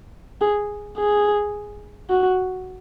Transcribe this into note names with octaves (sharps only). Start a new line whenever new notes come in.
G#4
G#4
F#4